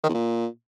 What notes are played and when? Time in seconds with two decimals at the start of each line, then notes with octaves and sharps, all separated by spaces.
0.04 D#3
0.09 E2
0.14 A#2